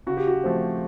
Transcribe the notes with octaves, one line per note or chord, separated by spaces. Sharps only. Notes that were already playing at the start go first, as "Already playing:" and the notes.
C#3 F#4
G4
F#4
F3 A3 C4